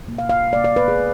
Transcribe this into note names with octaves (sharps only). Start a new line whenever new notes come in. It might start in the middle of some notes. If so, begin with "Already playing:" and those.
B2 A#3
F5
F5
B2 A#3 D5
D5
B4
G#4